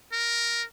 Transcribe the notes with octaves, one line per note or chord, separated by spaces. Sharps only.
A#4